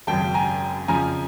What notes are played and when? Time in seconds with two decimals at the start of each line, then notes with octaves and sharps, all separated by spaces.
0.07 G#1 F#2 C#3 G5 A5
0.34 G#5 A#5
0.88 F2 C#3 F3 G#5 A#5